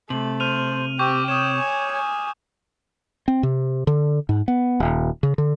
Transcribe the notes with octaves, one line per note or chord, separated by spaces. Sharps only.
C3 A3 F#7
C5 F6 D#7 F7
C4 G4 G5 C#6 D6 G6
C#5 D#6 E7
G#5
G#5
C4
C3
D3
G#2
B3
D#1
C#3
D3